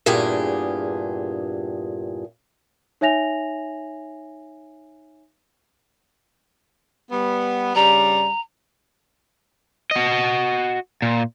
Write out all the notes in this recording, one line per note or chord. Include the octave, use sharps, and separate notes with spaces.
E2 G2 A#2 G4 G#4
D#4 C#5 E5 G#5 A#6 F7
G3 B3
G2 C#3 G3 A#5
F#4 D#5
A#2